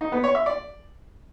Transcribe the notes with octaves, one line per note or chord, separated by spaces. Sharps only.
D#4
B3
C#5
E5
D5